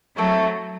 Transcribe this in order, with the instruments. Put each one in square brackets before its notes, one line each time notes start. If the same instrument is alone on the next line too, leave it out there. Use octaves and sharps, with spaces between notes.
[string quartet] F#3 A3 [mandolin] C4 E4 A4 C#5